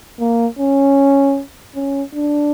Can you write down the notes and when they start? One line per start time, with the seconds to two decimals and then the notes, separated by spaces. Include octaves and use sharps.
0.20 A#3
0.59 C#4
1.76 C#4
2.14 D4